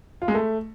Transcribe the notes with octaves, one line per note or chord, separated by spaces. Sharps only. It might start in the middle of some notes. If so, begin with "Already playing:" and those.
F4
G#3
A3